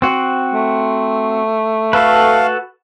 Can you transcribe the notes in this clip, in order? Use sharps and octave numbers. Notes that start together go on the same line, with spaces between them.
C4 F#4
A3
F#4 A4 B4 F5